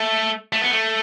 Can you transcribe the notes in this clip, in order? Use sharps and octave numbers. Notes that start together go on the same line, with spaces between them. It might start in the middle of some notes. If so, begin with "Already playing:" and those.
Already playing: A3
A3
B3
A3